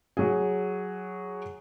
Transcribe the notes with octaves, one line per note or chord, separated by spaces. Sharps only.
F#3 G#4